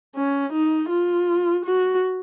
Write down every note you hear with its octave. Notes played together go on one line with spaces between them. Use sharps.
C#4
D#4
F4
F#4